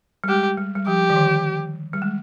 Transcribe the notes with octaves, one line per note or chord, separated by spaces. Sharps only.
G3
G#3 G4
G3
G3
F3 G4
D#3
D3
G3
G#3